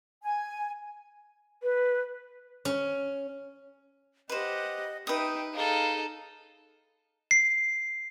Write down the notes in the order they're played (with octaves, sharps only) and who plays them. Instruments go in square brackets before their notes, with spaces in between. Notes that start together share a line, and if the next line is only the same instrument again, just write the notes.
[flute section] G#5
[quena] B4
[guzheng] C#4
[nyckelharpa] G4 F#5 [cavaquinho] B4 C5 [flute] D#5
[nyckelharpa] D#4 E5 [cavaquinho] B4 D#6 [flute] G5
[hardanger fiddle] D#4 A4 [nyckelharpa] G#4 [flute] F5
[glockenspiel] C7